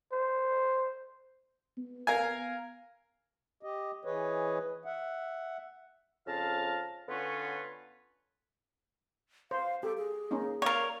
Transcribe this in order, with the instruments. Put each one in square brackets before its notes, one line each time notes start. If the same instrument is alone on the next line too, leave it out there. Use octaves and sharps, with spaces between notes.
[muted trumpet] C5
[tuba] B3
[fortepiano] A#4 F5 G#5
[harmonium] G4 D#5
E3 G#4 B4 C#5 D#5
E5 F#5
[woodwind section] F2 C#3 F5 A5 A#5 F6
D3 B3 C#4 F4 B4 C#5
[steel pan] C5 [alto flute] F5
[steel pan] G4 [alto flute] A4
[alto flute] G#4
[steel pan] A#3 C#4 D#4
[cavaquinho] A#4 C#5 [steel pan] D5 F5